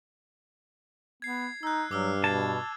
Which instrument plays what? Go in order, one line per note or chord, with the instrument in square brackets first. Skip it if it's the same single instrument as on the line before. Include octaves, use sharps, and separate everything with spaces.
[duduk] B3 [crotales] G#6 C7
[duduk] D#4 [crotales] E6 F#6
[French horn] G2 [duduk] F#3 [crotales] D6 E6 F6
[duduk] B2 [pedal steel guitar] A5 [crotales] G#6